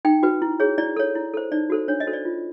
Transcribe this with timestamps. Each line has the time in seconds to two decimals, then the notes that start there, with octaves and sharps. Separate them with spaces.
0.05 D#4 G5
0.23 F#4 B4
0.42 E4
0.60 G#4 C#5
0.78 E4 D5
0.96 A4 C#5
1.15 E4
1.34 A4 C5
1.52 D#4 D5
1.70 F#4 A4 C5
1.88 D4 C#5
2.00 D#5
2.07 F#4 A4 C5
2.13 D5
2.25 F4